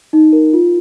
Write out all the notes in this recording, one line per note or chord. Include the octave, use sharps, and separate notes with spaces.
D#4
A#4
F4